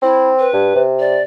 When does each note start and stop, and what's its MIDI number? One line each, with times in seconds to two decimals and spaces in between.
0.02 0.48 60
0.02 0.28 64
0.39 0.81 71
0.54 0.72 43
0.76 1.20 48
0.99 1.22 74